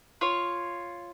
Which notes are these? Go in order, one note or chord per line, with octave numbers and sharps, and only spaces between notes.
F4 C#5